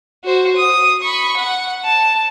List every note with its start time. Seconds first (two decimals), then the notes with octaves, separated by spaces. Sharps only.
0.25 F#4 C5
0.56 D#6
1.03 B5 C#6
1.37 F#5
1.85 A5